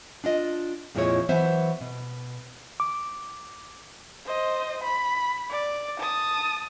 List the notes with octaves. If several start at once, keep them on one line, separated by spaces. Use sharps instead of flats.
D4 F4 D#5
F2 A#2 F3 G#3 E4 C#5
E3 F#3 B3 C5 E5
B2
D6
C5 D#5
B5
D5
A5 D#6